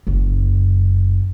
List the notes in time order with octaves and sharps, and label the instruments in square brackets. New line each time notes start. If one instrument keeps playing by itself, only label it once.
[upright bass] F#1 F#2